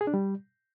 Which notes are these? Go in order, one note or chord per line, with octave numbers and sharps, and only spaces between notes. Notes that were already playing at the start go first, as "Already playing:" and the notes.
G#4
D4
G3